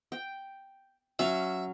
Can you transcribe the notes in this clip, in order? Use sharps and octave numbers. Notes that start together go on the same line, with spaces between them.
G5
F#3 C#4 E5 F5